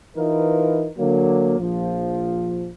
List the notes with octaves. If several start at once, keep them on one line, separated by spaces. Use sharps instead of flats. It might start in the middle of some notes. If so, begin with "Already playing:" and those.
E3 D#4 F4 A#4 B4
D3 F#3 A#3
A#1 F3